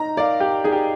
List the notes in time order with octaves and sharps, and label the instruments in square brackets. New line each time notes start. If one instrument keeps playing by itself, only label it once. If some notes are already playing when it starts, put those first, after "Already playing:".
Already playing: [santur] D#4 [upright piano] A#5
[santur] A#4 F5 [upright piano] D5
[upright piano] G4
[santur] D#4 [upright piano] G#4
[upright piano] G4